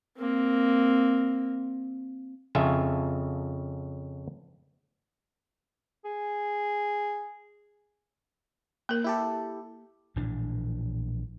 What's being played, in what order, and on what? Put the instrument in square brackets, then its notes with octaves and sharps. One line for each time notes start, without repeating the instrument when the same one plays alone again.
[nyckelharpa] A#3 C4
[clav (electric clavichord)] F2 C#3 F4 C#5 E5 G#5
[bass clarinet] G#4
[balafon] A#3 A#4 [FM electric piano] G6
[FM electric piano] E4 G4 A4
[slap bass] A#1 A2 E3 D4